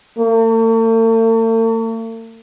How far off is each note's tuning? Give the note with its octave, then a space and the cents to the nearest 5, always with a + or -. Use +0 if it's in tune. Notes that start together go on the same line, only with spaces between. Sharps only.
A3 +45